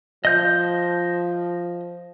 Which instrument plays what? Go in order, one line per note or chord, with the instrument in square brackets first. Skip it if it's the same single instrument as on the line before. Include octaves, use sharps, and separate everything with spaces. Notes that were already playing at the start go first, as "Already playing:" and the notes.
[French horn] F3 [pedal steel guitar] D#5 G6